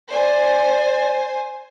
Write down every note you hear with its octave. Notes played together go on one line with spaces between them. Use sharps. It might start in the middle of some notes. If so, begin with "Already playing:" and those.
C5 D5 G#5